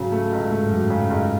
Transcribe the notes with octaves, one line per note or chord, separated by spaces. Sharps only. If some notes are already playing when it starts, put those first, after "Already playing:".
Already playing: G#2 C#3 F#3
A3
C#2
A2
G#2 A3
F#2 F#3
G#2 C#3
C#2 F#2